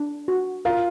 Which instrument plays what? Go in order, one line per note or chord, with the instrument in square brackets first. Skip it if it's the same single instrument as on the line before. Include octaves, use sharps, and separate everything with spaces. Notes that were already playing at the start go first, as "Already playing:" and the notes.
Already playing: [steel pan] D4
F#4
[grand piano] F4 [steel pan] A#4